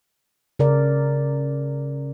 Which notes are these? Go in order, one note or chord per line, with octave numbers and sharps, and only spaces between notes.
C#3 A#4 D5